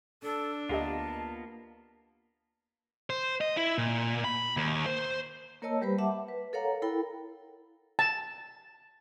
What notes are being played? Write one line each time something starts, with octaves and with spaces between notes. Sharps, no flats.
D4 A4
D2 A#3 B3 F4 G4 D#5 A5
C5
D#5
E4
A#2
B5
D#2
C5
A#3 A#4 C#5 D#5 A5 E6
G3 G4 B4 C5 B5
E5 F#5 A5 D6
B4
A4 A#4 C#5 F5 F#5 A#5
E4 A4 A#4 G5 B5
A5